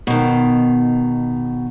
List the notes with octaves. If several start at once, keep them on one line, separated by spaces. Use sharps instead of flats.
B2 D#3